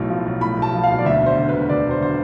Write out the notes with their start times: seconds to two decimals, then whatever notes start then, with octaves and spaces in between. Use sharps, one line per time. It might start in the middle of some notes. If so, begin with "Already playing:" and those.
Already playing: B1 A2
0.10 F3
0.26 B1
0.41 A2 B5
0.57 B1
0.62 A5
0.73 F3
0.84 F5
0.90 B1
0.99 D5
1.05 D2 E5
1.22 E1 C5
1.37 D3
1.49 E1 B4
1.69 D2 D5
1.86 E1 C5
2.01 D3 C5